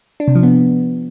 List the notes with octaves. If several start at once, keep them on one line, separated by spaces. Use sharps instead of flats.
D4
C3
F3
B3